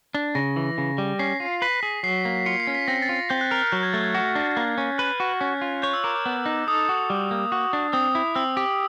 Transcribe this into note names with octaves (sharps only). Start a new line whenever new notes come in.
D4
C#3 A#6
E3
C#3
G3
C#4 C7
F4
B4 B6
G#4
F#3 C7
A#3
F4 C#7
C7
C#4
B6
C4 A#6
A6
F4
C4 G6
F#6
A#4 F6
F#6
F#3 G6
G#6
A3 A6
G#6
F#4
D4
A#3
C#4
B4 F#6
F#4
C#4 F#6
F4
C#5 G6
E6
A#4 D6
D6
B3
D#4
A4 D#6
F#4
G3
A#3
F#4
D4
C4 D#6
E4
C4 E6
G4